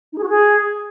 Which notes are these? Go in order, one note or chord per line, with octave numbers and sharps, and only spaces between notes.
D#4
G#4
F#4
G#4